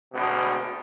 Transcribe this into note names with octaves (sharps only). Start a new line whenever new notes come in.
G#1 D2 B2